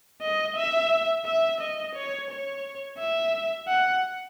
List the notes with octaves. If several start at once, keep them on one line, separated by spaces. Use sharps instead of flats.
D#5
E5
E5
D#5
C#5
C#5
E5
F#5